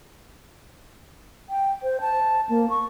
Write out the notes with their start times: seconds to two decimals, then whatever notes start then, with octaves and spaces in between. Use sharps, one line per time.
1.49 G5
1.83 C5
2.01 A5
2.49 A#3
2.70 C#6